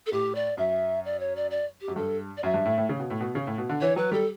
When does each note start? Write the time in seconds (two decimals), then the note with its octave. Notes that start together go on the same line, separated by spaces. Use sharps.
0.06 A4
0.12 A2 G4
0.35 D5
0.57 F#2 E5
1.05 D5
1.19 C#5
1.36 D5
1.50 D5
1.81 G4
1.88 F#2
1.96 G2 A4
2.37 D5
2.43 F#2 E5
2.54 G2
2.65 A2
2.78 A2
2.89 C#3
3.00 B2
3.10 A2
3.20 B2
3.35 C#3
3.47 A2
3.58 B2
3.69 D3
3.81 E3 C#5
3.96 F#3 B4
4.12 G3 A4